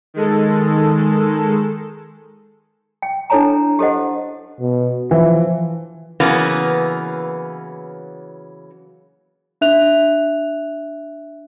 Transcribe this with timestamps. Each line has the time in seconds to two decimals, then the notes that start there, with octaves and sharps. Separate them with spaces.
0.14 D#3 G#3 A4
3.02 G5
3.30 D4 E4 A4 C#5 A5 A#5
3.79 G4 A4 C5 D#5 F#5
4.60 B2
5.11 E3 F3
6.20 C#3 E3 F#3 A#3 B3
9.61 D4 E5 F#6 F7